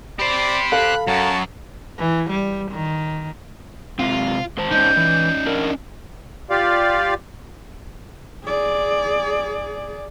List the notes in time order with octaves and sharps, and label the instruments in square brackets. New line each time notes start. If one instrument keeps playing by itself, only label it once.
[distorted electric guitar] G4 C5 [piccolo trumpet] D5 [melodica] B5
[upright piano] A4 F5 [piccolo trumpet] F#6
[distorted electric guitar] F#2 [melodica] F#4 C#5 A#5 [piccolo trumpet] A5
[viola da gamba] E3
G3
D#3
[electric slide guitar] C3 G#3 C4 [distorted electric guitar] F4
[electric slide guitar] G#2 C5 A5
[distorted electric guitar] C#4 D#4 [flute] G6
[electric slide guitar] E3
D4 A#4
[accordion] F4 G4 D5 F5
[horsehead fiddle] G#4 D5